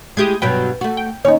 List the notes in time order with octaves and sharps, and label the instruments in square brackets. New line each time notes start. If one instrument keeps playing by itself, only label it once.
[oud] G#3 E4 G4 [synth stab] D#6 G6 G#6
[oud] G2 B2 F#3 [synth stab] B4 G5
[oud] A3 F#4
[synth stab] G5
[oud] D#2 C#5 [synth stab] C#4 D#4